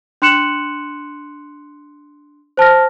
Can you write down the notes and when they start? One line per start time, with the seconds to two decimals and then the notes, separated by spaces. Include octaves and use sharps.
0.22 D4 C6 F#6 C#7 E7 F#7
2.57 C5 A5 F6 A#6